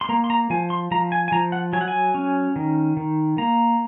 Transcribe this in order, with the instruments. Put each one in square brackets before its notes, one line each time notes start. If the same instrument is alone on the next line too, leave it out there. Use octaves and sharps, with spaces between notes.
[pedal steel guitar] C6
A#3 A#5
C6
A#5
F3 G#5
C6
F3 A#5
G#5
G#5
F3 A#5
F#5
F#3 G#5
F#5
G#5
C#4
D#3
D#3
A#3 A#5